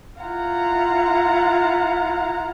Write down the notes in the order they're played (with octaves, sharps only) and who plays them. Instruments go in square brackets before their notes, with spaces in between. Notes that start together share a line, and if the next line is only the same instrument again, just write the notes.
[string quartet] E4 F4 F5 F#5 A#5